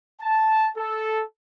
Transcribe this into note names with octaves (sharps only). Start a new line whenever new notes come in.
A5
A4